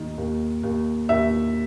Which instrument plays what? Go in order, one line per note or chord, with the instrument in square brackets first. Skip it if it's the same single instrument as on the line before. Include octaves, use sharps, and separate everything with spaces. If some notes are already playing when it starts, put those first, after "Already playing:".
Already playing: [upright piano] D#2 D#3
D#2
D#2
D#2 E5